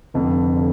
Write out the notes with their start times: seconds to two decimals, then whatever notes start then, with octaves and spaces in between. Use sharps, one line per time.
0.14 F1 F2 D3
0.55 D3